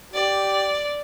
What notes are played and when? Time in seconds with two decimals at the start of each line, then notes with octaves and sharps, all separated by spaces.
0.14 G4 D5